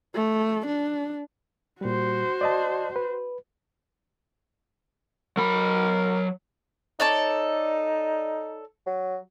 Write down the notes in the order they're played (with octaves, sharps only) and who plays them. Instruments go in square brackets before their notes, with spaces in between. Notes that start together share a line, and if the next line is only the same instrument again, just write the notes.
[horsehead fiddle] A3
D4
[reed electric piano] A#2 G3 [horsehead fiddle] F#4 C5
[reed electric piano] D5 D#5 A5
B4
[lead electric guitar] F#3 B5 [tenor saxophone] A#4
[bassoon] D#4 [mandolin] A4 C#5 D5
[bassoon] F#3